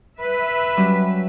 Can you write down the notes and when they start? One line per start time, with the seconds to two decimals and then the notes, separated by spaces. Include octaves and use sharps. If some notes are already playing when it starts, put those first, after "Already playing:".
0.18 B4 E5
0.77 F#3 G3 C#4